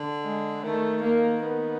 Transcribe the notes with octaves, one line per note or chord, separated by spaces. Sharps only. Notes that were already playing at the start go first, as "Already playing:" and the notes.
Already playing: D3
G#3
D#3 A3
A#3
B3